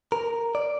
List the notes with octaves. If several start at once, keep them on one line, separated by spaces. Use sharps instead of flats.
A#4
D5